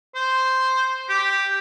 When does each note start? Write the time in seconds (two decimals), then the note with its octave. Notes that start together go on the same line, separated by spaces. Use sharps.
0.15 C5
1.09 G4